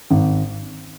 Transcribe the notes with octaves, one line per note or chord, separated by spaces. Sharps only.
G#1